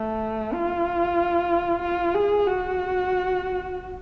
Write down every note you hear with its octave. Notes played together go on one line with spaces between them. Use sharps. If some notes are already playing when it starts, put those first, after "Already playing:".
Already playing: A3
F4
F4
G#4
F#4